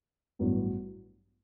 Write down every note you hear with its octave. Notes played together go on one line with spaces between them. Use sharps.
A1 G2 F#3 B3 E4